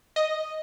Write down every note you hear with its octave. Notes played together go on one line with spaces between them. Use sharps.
D#5